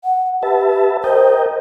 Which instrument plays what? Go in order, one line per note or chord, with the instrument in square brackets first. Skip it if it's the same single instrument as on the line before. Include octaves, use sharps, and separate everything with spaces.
[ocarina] F#5
[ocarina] G4 [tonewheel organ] B4 E5 A5
[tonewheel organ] A#4 D#5 G5 [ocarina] C5